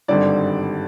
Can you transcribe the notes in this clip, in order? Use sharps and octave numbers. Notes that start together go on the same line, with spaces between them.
G#1 G2 D3 G3 D5